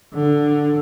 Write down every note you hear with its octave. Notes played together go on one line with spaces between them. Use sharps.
D3